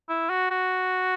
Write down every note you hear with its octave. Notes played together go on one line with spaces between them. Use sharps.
E4
F#4
F#4